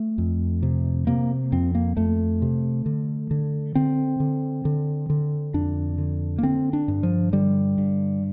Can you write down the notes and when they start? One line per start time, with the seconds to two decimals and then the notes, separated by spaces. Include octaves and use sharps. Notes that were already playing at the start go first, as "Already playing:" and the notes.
Already playing: A3
0.18 F2
0.63 C3
1.07 C3 A#3
1.52 F2 C4
1.75 A#3
1.97 F2 A3
2.42 C3
2.86 D3
3.31 D3
3.75 D3 C4
4.20 D3
4.65 D3
5.10 D3
5.54 F2 D4
5.98 D3
6.38 A#3
6.43 D3 C4
6.73 D4
6.88 G2
7.03 F3
7.32 D3 G3
7.78 G2